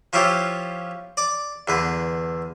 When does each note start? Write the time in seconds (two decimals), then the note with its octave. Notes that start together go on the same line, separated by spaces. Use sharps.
0.13 F3 C#4 E4 F4 G4
1.17 D5 D6
1.68 E2 D3 B4